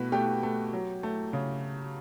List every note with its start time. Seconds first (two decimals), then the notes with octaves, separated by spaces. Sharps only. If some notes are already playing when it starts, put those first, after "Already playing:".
Already playing: B2 A3 B4
0.12 A3 G4
0.43 A3
0.73 F#3
1.03 A3
1.33 C#3